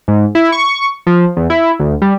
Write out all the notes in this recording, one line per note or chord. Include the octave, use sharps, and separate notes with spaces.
G#2
E4
C#6
F3
E2
E4
D2
G3